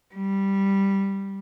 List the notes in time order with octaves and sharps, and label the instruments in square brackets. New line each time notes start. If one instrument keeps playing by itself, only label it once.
[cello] G3